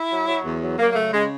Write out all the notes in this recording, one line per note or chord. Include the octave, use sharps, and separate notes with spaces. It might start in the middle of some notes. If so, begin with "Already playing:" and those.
Already playing: E4
F#3
F#3
E2
F#3
F#3 A#3
A#3
C#3 A3
C#3 G#3